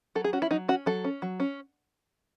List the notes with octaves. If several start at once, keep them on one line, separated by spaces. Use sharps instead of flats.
F#3 A4
G#4
C#4 F#4
E4
F#3 D#4
C#4 F#4
F#3 A4
C#4
F#3
C#4